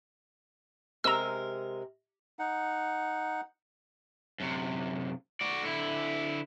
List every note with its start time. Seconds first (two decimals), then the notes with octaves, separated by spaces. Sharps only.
1.04 C3 G#3 A#4 A#5 E6
2.39 D#4 F#5
4.40 F#2 C3
5.41 F#4 D5
5.63 D3 E4